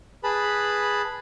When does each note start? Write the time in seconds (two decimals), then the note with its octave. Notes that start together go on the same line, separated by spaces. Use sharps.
0.24 G#4 B4 A5 B5